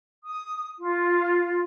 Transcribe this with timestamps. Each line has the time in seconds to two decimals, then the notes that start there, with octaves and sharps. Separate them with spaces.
0.25 D#6
0.78 F4